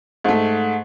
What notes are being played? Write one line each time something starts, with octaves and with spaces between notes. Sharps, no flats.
G#2 A3